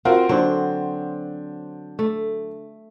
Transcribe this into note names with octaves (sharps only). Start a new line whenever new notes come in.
C4 F4 F#4 A#4 C5
D3 F#3 C4 D4 C5
A3